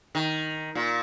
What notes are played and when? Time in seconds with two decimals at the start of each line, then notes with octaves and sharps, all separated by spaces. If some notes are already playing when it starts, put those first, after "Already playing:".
0.15 D#3
0.75 A#2